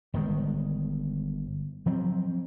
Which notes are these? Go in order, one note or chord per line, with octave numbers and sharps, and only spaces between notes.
G1 D#3 G#3
F3 F#3 C4